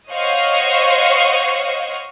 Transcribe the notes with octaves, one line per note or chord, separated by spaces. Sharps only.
C5 C#5 D#5 F5 F#5 C#6